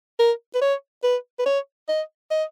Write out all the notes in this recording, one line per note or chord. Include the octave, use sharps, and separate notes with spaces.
A#4
B4
C#5
B4
B4
C#5
D#5
D#5